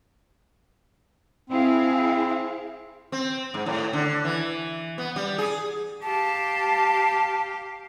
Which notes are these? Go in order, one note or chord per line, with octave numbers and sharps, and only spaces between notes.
C4 E4 G#4 F5
C4
G#2
A2
D3
E3
B3
G3
G#4
G4 F5 A5